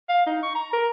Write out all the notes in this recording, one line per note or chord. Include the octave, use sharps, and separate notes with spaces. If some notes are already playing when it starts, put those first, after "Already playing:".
F5
D#4
C#6
A#5
A#4